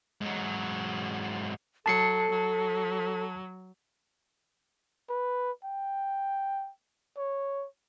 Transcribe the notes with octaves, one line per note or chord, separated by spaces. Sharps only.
G#2 F#3
F#3 A4 A5 C7 C#7
F#3
B4
G5
C#5